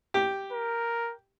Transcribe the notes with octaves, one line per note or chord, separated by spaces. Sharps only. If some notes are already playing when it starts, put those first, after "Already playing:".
G4
A#4